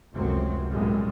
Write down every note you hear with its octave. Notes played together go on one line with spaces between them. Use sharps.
F1 C#2 F#2 F#3 C4
B1 F#2 A2 G3 G#3